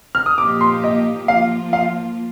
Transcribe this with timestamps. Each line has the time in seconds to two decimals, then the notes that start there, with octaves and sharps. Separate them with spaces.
0.15 F6
0.26 D#6
0.38 A#2 F3 A#3 D#4 G4 D6
0.61 C6
0.84 D#5
1.28 F3 A#3 F4 F5
1.73 F5